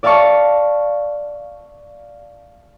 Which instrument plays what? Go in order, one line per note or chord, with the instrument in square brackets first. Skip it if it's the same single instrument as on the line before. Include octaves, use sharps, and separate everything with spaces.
[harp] D5 E5 F5 A5 C#6 C#7